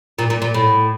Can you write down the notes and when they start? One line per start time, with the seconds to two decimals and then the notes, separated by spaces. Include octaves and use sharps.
0.19 A#2
0.30 A#2
0.42 A#2
0.54 A2